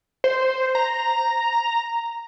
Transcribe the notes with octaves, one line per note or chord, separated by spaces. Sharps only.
C5
A#5